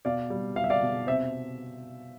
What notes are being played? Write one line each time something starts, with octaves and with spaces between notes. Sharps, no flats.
B2 D5 F5
G3
G3 F5
E5
D5 F5
B2
C3 C5 E5